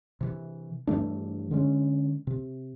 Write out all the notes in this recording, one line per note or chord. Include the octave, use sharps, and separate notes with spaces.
C3 E3
G2 E3 A3 D4
D3 G#3 C#4
C3